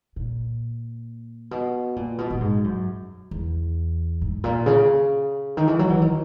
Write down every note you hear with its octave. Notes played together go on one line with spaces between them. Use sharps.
A#2
B2
A#2
B2
A#2
G#2
F#2
E2
G#2
A#2
C#3
D#3
E3
F#3
E3
D#3